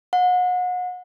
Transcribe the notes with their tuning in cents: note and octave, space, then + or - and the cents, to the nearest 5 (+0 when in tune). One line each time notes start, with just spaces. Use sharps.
F#5 -35